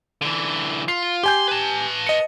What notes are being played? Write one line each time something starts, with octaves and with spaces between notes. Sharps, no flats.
D3 E3
F4 C7
G4 G#5 C6 G6
B4 A5
D#5 C#7